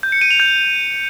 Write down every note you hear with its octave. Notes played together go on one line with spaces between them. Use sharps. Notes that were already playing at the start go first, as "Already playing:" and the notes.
G6
C#7
D#7
F7
G6